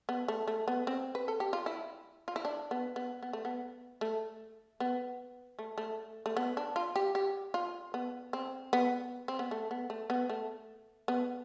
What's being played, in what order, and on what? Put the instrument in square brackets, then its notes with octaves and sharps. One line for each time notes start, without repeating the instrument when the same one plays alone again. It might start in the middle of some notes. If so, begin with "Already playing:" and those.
[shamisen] B3
A3
A3
B3
C4
B4
A4
G4
F4
E4
F4
E4
D4
B3
B3
B3
A3
B3
A3
B3
A3
A3
A3
B3
D4
F4
G4
G4
F4
B3
C4
B3
C4
B3
A3
B3
A3
B3
A3
B3